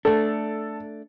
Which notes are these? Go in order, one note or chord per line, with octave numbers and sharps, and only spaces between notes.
A3 D4 A4